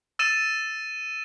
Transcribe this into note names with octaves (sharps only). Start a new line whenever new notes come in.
E6 A6 D#7 E7